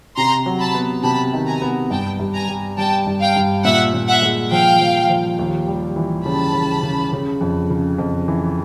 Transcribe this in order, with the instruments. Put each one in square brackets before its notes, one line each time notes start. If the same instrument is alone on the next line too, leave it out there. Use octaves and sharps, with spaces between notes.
[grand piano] C3 [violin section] A#5 C6
[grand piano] F#3
[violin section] A5 B5
[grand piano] B3
[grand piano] C3 [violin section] A5 B5
[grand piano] D#3
[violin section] G#5 A#5
[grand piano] B3
[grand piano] G2 [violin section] G5 A5
[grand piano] G2
[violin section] G#5 A#5
[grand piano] G3
[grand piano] G3 [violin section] G5 A5
[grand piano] G2
[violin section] F5 G5
[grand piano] G2
[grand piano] A#2 [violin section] E5 F#5
[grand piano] A#2
[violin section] E5 F#5
[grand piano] G#3
[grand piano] F3 [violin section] F5 G5
[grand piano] F3
F3
D#2
G3
E3
[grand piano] C#3 [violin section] A5 B5
[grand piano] C#3
C#3
C#3
F2
C#3
F2
E3